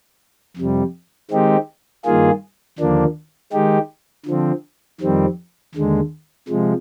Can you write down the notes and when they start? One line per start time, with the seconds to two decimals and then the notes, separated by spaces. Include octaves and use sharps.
0.56 F2 C3 G3
1.31 D#3 G#3 C4 D#4 G4
2.05 G2 D#3 A#3 F4 G#4
2.78 D#2 D3 F3 A#3 D4
3.53 D#3 G#3 D#4 G4
4.26 D3 F3 C4
5.01 F2 D#3 G3 C4
5.75 D#2 D3 G#3
6.48 C3 F3 G#3